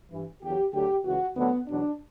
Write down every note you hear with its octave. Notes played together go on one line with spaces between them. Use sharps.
G2 E3
E2 D3 F#3 G4
D2 D3 F#3 G4
C#2 C#3 E3 F#4
D2 D3 F#3 B3
E2 B2 F#3 D4